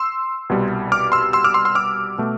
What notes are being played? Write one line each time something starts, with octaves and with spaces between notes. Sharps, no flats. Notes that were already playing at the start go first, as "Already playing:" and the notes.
Already playing: C6 E6
C2 B2 G3
D6 F6
C6 E6
C6 E6
D6 F6
C6 E6
C6 E6
D6 F6
B2 A3